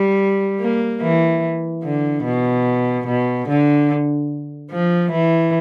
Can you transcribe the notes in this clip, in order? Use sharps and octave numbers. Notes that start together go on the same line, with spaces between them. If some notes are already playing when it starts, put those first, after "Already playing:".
Already playing: G3
A#3
E3
D3
B2
B2
D3
F3
E3